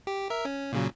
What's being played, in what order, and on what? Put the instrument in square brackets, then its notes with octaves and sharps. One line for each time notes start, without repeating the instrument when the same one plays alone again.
[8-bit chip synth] G4
A#4 E5
C#4
A#2 C#3 F#3